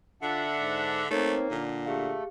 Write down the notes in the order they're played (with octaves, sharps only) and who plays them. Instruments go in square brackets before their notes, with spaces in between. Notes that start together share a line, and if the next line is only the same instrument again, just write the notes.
[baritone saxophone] D3 [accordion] D4 E5 F#5 [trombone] F4
[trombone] G#2
[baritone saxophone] A3 [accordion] A#3 [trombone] C4 [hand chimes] D#4 A#4 C#5
[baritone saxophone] A#2 [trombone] D3 [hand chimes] A4
[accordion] A3 [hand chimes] G4 G#4 F5